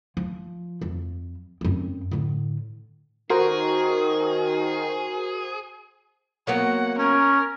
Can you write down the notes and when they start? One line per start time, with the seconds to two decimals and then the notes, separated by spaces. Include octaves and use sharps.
0.17 F3
0.81 F2
1.61 F#2 C4
2.11 A2 D3
3.30 D#3 F#4 G#4 A#4 C5 C#6
6.47 F#3 A#3 B3 F#5
6.98 C#4 A#4